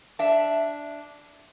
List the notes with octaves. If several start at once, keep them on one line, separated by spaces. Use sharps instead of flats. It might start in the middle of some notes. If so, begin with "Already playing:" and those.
D4 E5